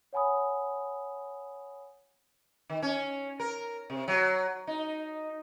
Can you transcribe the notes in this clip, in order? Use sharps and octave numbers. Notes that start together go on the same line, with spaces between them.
C#5 F#5 G#5 B5 D#6
D#3
C#4
A#4
C3
F#3
D#4